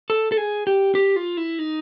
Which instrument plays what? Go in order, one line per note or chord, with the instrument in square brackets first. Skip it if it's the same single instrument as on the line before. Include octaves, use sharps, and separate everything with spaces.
[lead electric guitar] A4
A4
G#4
G4
G4
F4
E4
D#4